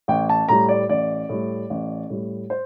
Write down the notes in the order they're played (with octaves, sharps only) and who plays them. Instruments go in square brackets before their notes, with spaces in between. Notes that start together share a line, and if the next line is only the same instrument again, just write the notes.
[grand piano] A1 G5
A5
A2 G3 A#5
D5
A1 D5
A2 G3
A1
A2 G3
C5